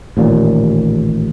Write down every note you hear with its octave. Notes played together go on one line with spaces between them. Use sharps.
A1 D#2 A#2